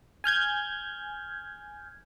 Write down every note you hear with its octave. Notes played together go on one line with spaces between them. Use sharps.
G#5 F6 G6 G#6